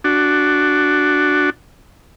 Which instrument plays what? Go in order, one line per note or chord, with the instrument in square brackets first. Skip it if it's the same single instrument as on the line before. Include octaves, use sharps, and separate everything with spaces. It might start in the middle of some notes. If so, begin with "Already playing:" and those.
[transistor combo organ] D4 F#4